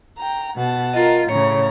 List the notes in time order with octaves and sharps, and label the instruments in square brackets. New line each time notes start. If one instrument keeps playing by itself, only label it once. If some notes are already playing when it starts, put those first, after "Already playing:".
[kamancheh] G5 A#5
[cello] B2 [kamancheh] F#5 A5
[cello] F4 A#4 [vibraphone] D#5 A#5
[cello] A2 C#3 [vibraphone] C#5 [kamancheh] A#5 C#6